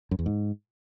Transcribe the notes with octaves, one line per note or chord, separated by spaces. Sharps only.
F#2
E2
G#2